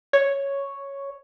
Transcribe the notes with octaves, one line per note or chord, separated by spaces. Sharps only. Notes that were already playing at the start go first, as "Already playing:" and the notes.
C#5